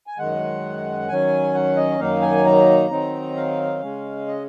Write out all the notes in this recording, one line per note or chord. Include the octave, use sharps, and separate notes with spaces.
G#5
F#2 D#3 G#3 F#5
D#3 F#3 C#4 G#5
F#5
D#5
F#2 D#3 F#3 A#3 D#4 F5
G#5
A#5
D#3 F#3 C4 D#4
F5
C#3 G#3 C#4
D#5